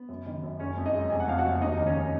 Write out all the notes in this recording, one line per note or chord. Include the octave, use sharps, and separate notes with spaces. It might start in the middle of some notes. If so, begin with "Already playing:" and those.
Already playing: B3
F#2
D#3
F#2
F#1 C#4 C#5
F2
D#4 D#5
G#3
F1 G#5
F#5
F2 F5
F#4 F#5
F1
D#2 D#4 D#5
D#3
C#4 C#5